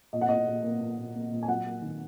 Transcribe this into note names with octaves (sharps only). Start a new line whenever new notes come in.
A#2 D#5
F#5
A#2 D#5
A#2
A#3
A#2
A#2
A#3
A#2
G#5
F#3 F#5
A#3
D#3